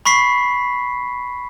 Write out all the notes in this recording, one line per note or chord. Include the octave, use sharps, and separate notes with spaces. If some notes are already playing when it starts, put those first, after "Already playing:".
B5 C#6 B6 C7